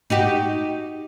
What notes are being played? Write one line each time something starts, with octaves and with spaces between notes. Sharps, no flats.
D#4 F#4 G4